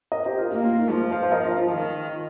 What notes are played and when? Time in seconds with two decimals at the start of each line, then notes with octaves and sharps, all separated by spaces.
0.12 A#4 D#5
0.25 G4 C5
0.38 F4 A#4
0.52 A#3 F4 A#4
0.65 F4
0.79 D#4
0.91 F3 F4
1.11 C5 F5
1.23 C5
1.32 A#4 D#5
1.45 F4 A#4
1.58 F4
1.72 D#3